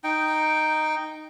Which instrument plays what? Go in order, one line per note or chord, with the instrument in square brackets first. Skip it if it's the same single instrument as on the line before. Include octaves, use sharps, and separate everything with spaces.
[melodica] D#4 G5